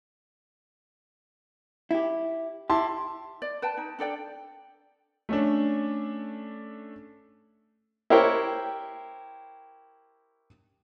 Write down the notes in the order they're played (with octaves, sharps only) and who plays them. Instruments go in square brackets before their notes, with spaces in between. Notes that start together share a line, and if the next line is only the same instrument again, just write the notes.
[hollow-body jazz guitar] E4 G4
[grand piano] E4 A5 C6 [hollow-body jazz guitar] G4
[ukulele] D5
B4 G5 A5
D#4
D4 A4 D5 G5
[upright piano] A3 C#4 D4
[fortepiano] E4 G4 A#4 C5 C#5 G5